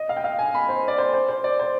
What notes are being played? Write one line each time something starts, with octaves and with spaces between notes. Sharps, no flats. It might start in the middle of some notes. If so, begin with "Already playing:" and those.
Already playing: D#5
F5
G5
F5
G#5
B5
C5
D5
C5
C5
C5
D5
C5